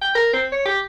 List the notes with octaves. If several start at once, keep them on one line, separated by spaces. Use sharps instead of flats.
G5
A#4
C4
C#5
G4